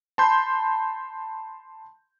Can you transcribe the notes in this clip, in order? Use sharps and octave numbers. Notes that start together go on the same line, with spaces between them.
A5 B5 C6 G6